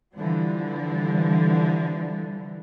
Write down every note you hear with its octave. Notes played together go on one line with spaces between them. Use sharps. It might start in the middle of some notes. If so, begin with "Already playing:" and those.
D3 E3 F3 G3